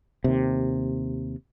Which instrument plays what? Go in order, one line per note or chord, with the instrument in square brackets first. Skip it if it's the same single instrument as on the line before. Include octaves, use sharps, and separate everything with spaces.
[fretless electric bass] D#2 C3